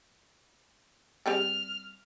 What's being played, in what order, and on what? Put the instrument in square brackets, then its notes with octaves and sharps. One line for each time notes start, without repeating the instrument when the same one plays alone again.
[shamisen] G3 C4 G#4 [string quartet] F6